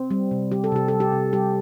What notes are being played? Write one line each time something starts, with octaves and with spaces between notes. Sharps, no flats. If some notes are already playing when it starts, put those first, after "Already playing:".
Already playing: C4
G3
C3
G3 G4
A4
C3 G4
G3 A4
G4
C3
G3 G4